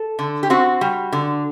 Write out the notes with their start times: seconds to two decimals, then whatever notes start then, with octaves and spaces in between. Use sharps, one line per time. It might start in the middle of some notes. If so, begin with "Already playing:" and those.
Already playing: A4
0.19 D3
0.43 G4
0.50 C4 F#4
0.81 G3
1.12 D3